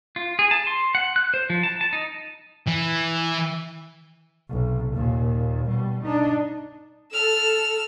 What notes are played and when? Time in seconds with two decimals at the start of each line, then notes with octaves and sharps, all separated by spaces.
0.16 F4
0.39 G#4
0.51 A5
0.67 C6
0.95 F#5
1.16 F#6
1.34 C5
1.50 F3
1.63 A5
1.81 A5
1.93 D#4
2.67 E3
4.49 B1 C3
4.93 D#2 A#2
5.68 B2 G3
6.04 D4 D#4
7.12 A4 E6 F6